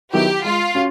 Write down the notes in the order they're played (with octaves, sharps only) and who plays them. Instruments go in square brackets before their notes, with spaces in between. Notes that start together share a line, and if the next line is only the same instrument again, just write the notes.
[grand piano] D#3 F#3 B3 E4 [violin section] G4
[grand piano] G#3 [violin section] F4
[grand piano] C#4 F#4